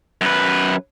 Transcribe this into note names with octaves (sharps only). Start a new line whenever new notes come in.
F#2 B4